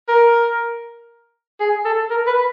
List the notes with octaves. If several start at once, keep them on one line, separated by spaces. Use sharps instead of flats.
A#4
G#4
A4
A#4
B4